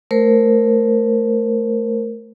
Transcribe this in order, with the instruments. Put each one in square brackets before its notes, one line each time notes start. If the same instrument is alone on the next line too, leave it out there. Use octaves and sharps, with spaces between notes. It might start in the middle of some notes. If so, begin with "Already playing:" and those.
[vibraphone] A3 A#4 C5